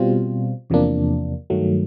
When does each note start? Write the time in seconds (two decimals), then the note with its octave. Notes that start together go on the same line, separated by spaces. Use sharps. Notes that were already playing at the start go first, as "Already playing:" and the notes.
Already playing: B2 G3 C4 F4
0.70 E2 C3 F3 A#3 D4
1.50 G2 D#3 F#3 A3